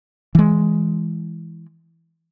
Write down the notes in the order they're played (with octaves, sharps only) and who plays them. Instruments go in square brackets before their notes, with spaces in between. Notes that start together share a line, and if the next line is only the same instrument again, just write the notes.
[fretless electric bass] E3 G#3